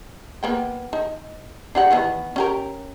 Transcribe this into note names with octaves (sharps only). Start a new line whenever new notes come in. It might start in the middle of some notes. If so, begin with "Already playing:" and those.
A#3 B3 G5
D#4
D4 G4 F#5
D#3 E3 B3
C#4 G4 A#4